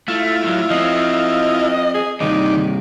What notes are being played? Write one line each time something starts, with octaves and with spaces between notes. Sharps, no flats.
A3 E4 F4
A2 F#3
F3 C4 D#5
G#4
G2 C3 D#3 D#4 D5